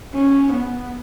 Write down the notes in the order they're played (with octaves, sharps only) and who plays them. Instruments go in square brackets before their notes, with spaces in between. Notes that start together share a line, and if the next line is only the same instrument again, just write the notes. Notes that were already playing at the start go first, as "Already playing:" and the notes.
[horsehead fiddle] C#4
B3